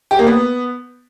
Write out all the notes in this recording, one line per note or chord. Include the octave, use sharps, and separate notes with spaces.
G4
A#3
B3